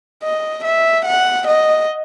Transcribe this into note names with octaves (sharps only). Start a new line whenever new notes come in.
D#5
E5
F#5
D#5